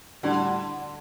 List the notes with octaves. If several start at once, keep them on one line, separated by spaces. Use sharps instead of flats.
A2 D3 G3 D4 F#4